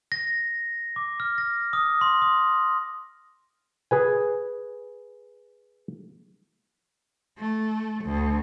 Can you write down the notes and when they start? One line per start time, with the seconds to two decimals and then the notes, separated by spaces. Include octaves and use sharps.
0.12 A#6
0.96 D6
1.20 F6
1.38 A#6
1.73 D#6
2.01 C6
2.22 D#6
3.91 G#4 B4 G#5
7.38 A3
8.05 D2